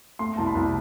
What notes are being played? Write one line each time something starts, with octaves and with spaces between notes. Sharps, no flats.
A3 C6
C2 A5
B5
C2